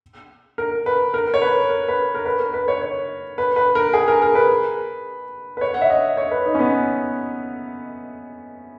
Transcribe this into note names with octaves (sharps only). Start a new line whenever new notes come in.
A#4
B4
A#4
C#5
B4
A#4
B4
A#4
B4
A#4
B4
C#5
C#5
B4
B4
A#4
G#4
A#4
A#4
B4
B4
C#5
F#5
E5
D#5
C#5
B4
D#4
C#4
B3